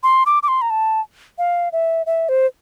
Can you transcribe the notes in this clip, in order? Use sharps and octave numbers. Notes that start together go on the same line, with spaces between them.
C6
D6
D6
C6
A#5
A5
F5
E5
E5
C5